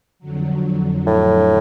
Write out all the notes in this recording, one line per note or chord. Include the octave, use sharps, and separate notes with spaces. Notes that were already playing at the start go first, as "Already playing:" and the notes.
F2 D3 F#3
A2